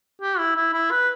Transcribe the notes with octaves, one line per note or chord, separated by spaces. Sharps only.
G4
E4
E4
E4
B4